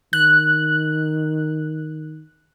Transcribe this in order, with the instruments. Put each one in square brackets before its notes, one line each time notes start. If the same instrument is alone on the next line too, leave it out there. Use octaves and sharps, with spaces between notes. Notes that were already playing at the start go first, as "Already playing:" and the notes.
[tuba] D#3 [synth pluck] F#6